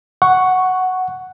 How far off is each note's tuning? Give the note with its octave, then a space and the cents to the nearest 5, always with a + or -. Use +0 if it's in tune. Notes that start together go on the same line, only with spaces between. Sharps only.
F#5 +0 C#6 +0